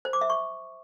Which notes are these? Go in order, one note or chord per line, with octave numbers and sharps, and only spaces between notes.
C5
D6
E5
C#6